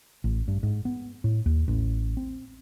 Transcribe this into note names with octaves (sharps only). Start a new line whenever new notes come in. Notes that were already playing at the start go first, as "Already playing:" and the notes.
A1
G2
G#2
B3
A2
D#2
A1
C4